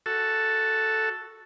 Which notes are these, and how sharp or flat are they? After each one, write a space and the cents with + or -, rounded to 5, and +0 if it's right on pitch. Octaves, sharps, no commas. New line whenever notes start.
F#4 +0 A4 +0